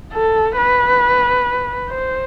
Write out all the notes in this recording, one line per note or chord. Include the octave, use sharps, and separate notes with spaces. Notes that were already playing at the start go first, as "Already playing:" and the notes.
A4
B4
C5